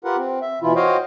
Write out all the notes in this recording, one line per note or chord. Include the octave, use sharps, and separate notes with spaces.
F4 G4 A#4 B4 F#5
C4
E5
B2 E3 E4 F4
F#4 C5 C#5 D#5 F5 G5